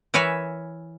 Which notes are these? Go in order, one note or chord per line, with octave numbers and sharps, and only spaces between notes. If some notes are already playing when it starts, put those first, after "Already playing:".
E3 A#4 B4 C#5 E5 G#5